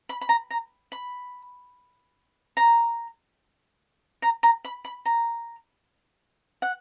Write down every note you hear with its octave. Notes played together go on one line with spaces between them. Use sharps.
B5
B5
A#5
A#5
B5
A#5
A#5
A#5
B5
B5
A#5
F#5